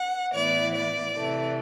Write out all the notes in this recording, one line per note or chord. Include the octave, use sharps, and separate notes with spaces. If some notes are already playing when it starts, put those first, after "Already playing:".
Already playing: F#5
A2 E3 B3 E4 D5
D5
C3 E3 A3